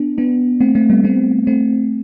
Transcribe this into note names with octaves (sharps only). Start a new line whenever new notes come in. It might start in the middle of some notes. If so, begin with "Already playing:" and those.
Already playing: B3 D4
B3 D4
A3 C4
A3 C4
G3 B3
A3 C4
A3 C4